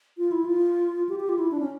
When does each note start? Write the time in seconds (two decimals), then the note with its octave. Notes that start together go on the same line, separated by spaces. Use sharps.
0.18 F4
0.32 E4
0.45 F4
1.09 G4
1.20 G4
1.29 F4
1.39 E4
1.51 D4
1.60 C#4